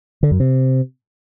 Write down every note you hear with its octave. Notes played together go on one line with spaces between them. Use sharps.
D3
F#2
C3